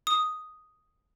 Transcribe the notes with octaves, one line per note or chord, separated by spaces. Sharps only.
D#6